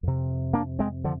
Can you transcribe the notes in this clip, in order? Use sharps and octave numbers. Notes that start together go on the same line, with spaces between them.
F2 C3
A#3 D4
G#3 C4
D3 F3